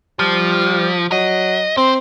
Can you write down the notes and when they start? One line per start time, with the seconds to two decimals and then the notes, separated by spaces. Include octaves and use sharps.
0.19 F3 G3
1.12 F#3 D#5
1.77 C4 C5